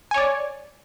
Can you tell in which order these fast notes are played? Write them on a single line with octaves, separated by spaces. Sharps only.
G#5 C#5 D5